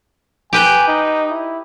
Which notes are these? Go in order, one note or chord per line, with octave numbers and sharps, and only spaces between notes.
G4 B4 G5 G#5
D#4
E4